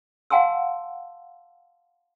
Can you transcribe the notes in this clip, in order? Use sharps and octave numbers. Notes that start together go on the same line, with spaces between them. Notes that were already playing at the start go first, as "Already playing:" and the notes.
F5 F#5 G#5 A5 C6 E6